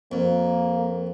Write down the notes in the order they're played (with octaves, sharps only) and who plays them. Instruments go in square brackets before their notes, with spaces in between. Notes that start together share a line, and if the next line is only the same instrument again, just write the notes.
[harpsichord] F2 [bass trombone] A#3